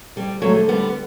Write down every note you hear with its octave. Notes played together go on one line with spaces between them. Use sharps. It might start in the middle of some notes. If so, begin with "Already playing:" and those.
D2 G3
F#3 A3
D3
G3 B3